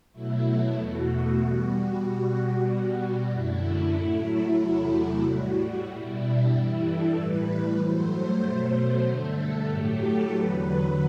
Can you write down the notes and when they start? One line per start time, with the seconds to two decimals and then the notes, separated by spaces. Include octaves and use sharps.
0.12 B2 F#3 A3 E4
0.76 E2 B2 A3 F#4
1.07 F#4
1.39 B2 G3 F#4
2.03 B2 G3 F#4
2.67 B2 G3
3.31 F#2 D3 A3 E4
3.95 A2 F#3 A3 E4
4.58 E2 C3 F#3 A3 E4
5.22 A2 G3 F#4
5.54 F#4
5.86 B2 G3 E4
6.18 D4
6.49 G2 E3 G3 E4
6.82 A4
7.13 A2 E3 G3 B4
7.77 G2 F#3 A3 C5
8.41 B2 F#3 A3 C5
9.04 G2 D3 A3 A4
9.68 A2 F#3 A3 G4
10.00 A4
10.32 E2 D3 F#3 B4